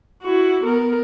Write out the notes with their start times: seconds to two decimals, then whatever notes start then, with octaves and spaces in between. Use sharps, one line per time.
0.22 E4 F#4
0.64 B3 A#4